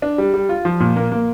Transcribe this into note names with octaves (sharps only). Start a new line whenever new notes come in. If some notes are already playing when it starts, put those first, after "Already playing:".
D4
G3
G3
F4
F3
A#2
A#3
A#3